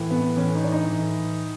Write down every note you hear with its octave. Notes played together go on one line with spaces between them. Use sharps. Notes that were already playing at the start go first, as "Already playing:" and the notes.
Already playing: A2 E3
B3
A2 E3 C#4
D#4
D4
D#4
A2 E3